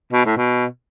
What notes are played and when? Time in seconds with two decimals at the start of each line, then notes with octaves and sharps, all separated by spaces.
0.13 B2
0.25 A2
0.37 B2